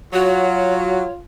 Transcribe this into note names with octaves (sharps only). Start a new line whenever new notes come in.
F#3 F4 F#4 C#5